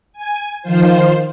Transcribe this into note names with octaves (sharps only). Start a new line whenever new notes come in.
G#5
D#3 F3 F4 C5